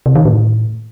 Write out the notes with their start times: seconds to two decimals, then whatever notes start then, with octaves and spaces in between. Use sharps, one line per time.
0.06 C3
0.16 D#3
0.25 A2